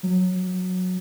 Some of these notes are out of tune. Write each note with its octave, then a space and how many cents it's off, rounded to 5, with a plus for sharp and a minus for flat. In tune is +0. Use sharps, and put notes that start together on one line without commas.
F#3 -15